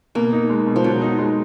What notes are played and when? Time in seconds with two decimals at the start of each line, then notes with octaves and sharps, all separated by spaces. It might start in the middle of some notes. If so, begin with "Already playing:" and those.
0.15 B2 A#3
0.32 D#4
0.50 G#3
0.66 B2
0.76 F3
0.84 B2 F#3
1.02 D#4
1.18 G#3